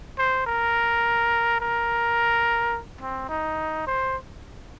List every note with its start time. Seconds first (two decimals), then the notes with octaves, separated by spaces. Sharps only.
0.19 C5
0.47 A#4
1.60 A#4
3.01 C4
3.29 D#4
3.87 C5